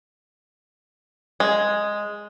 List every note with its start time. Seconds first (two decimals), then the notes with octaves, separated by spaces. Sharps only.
1.40 G#3